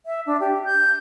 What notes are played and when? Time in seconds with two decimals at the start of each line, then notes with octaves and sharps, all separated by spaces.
0.06 E5
0.26 D4
0.40 G4
0.65 G6